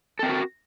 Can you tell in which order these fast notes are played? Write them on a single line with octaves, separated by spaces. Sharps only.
A4 C4 A#4 F#4